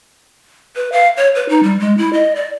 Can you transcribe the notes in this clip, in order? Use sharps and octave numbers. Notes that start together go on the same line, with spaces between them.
B4
F5
C#5
B4
D#4
G3
G#3
E4
D#5
D5